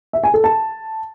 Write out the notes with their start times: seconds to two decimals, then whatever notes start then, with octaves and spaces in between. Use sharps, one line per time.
0.13 E5
0.24 G#5
0.34 A4
0.44 A5